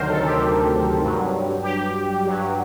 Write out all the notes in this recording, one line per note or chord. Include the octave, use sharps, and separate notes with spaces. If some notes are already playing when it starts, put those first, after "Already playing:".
Already playing: D2 C3 D#3 F#3 A#4 C5
A4
G4
G2 F#3
G4
G2 F#3